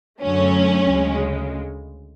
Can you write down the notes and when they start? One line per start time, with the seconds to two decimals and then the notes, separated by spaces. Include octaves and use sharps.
0.21 F#2 D3 F#3 A3 C#4
0.89 D2 C#3 G#3